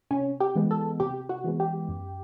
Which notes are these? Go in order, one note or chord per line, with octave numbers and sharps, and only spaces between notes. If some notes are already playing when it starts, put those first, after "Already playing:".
C3 C#4
G4
E3 G#3 B3
A4
C3 G4
F#4
E3 G#3 B3
G4
F#2